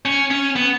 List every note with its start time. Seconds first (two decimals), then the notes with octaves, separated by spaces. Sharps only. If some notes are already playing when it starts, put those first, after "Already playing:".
0.06 C#4
0.31 C#4
0.56 B3